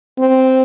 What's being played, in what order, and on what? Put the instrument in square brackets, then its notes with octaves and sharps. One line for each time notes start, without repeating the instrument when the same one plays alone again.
[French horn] C4